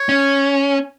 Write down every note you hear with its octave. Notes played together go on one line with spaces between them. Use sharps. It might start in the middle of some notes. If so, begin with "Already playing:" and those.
Already playing: C#5
C#4